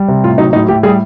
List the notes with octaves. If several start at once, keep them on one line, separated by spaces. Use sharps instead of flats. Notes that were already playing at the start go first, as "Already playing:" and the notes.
Already playing: G3
C3
A2 F4
F#3 D#4
A2 D#4
A2 G4
G3 G#4